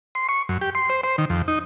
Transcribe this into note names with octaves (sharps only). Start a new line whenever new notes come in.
C6
C#6
F#2
G4
C6
C5
C5
D#3
F2
D#4